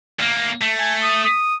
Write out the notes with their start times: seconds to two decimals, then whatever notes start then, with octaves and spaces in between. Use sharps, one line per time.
0.19 D2 A#3
0.61 A3
0.80 G#5
1.03 D#6
1.25 D#6